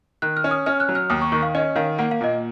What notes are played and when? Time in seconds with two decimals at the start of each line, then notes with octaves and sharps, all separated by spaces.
0.22 D#3 F#6
0.37 F6
0.44 C#4
0.51 D#6
0.66 C#4 F6
0.80 F#6
0.89 F#3
0.95 F6
1.10 D#2 D#6
1.21 C#6
1.32 D#3 C#6
1.43 F5
1.55 C#4 D#5
1.76 D#3 F5
1.99 A#3 F#5
2.11 F5
2.21 A#2 D#5